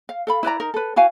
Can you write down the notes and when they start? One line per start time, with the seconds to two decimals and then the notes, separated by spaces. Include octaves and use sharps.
0.09 F5
0.27 A4 F5 B5
0.43 E4 B4 D5 A#5
0.60 D#4 A#4
0.74 A4 B4
0.96 E4 F#4 F5 G#5